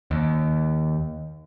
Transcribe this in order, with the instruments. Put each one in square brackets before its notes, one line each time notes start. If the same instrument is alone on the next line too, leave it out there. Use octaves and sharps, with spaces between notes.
[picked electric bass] D#2